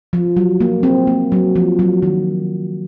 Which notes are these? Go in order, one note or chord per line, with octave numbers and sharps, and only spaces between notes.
F3
F#3
A#3
C4
A#3
F#3
F3
F#3
D#3